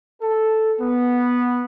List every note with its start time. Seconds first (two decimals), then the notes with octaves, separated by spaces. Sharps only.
0.22 A4
0.80 B3